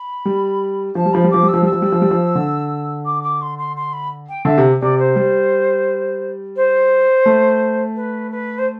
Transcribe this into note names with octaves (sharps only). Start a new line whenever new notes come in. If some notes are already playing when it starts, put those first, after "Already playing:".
Already playing: B5
G3
F3 A5
G3
F3 B5
G3
F3 D6
G3
E6
F3
G3 E6
F3
G3
F3
G3
F3
D3
D6
D6
C6
C6
C6
B5
G5
D3 E5
C3
C3 D5
C5
G3
C5
A3
B4
B4
C5